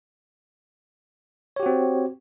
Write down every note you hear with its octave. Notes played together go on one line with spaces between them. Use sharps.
C4 F#4 G4 C#5